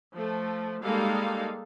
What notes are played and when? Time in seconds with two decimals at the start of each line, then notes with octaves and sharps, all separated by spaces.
0.14 F3 A3
0.83 G3 G#3 A#3 D#4 A4 F5